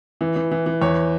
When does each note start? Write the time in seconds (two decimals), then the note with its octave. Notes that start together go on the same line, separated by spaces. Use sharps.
0.21 E3
0.36 E3
0.51 E3
0.66 E3
0.81 E2 C#5